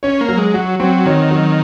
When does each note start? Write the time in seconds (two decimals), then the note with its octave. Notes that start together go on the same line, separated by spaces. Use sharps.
0.03 C#4 C#5
0.21 A#3
0.29 F#3
0.38 G#3
0.54 F#3 F#4
0.80 F#3 C4
1.06 D#3 C#5
1.31 F#3